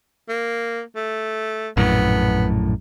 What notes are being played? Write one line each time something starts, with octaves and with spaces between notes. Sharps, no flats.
A#3
A3
A#1 F#2 A2 B3